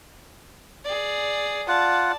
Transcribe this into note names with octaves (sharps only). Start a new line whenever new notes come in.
G#4 D5
F4 D5 F#5 A5